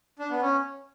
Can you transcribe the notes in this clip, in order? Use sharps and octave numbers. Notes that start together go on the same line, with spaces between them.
D4
B3
C#4